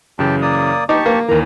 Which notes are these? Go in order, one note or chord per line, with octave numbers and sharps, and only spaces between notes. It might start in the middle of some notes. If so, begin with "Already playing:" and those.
F#2 C#3 E3 G4 G5 A5
A#3 D5 D#6
D#4 G4 A5 C#6 D6
A#3
D#2 E3 A#4 A#5